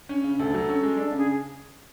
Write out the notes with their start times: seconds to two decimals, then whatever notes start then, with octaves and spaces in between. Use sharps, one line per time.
0.09 C#4
0.24 C#3
0.39 D2 A4
0.54 F#3
0.69 C#4
0.83 G#3
0.97 D4
1.12 C#3
1.19 G#4